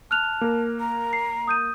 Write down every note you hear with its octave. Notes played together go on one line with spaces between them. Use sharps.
A5 F6 F#6 F7
A#3 A#4
A#5
C7
D#6 G6 D#7